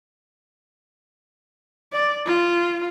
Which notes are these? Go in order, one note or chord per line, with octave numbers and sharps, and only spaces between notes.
D5
F4